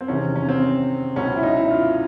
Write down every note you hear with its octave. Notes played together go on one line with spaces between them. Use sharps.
C4
E2 C3 D#3 C#4
C#4
C4
C#2 B2 F#3 C#4
E4
D#4
E4
F4